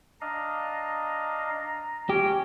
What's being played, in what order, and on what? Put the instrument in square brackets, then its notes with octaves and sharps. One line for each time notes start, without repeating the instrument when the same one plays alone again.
[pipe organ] D4 D#5 F5 [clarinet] A#5
[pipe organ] C#4 [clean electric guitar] G4 [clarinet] D6